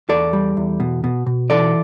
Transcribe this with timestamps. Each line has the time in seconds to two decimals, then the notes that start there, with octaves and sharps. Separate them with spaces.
0.09 E2 A4 D5
0.33 G3
0.57 E2
0.80 B2
1.04 B2
1.26 B2
1.50 E3 A4 D5